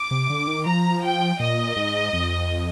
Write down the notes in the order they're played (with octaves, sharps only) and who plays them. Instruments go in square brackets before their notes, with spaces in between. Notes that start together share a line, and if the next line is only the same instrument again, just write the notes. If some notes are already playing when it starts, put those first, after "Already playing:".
Already playing: [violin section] D6
[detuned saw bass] C3
D3
D#3
[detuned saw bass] F3 [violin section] A#5
[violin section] G5
[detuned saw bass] A#2 [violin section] D#5
[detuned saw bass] G#2
F2